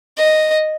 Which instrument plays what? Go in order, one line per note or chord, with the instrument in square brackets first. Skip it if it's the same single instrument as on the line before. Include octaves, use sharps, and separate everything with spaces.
[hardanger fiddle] D#5